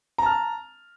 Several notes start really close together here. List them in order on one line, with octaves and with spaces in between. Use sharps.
A#5 A5 F6